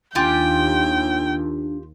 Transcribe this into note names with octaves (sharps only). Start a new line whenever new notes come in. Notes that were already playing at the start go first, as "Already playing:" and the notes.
D#2 D4 F4 G4 G5 G#5